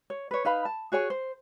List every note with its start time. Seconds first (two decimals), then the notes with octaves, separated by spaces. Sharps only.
0.10 C#5
0.31 B4 C#5
0.45 D#4 B4 F5 B5
0.65 A5
0.92 F#4 G#4 C#5 G#5
1.10 C5